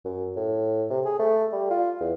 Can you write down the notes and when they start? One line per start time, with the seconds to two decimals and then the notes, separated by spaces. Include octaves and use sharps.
0.05 F#2
0.36 A2
0.90 C3
1.05 G#4
1.19 A3
1.52 G3
1.70 F4
2.00 E2